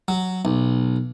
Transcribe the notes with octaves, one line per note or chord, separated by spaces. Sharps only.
F#3
B1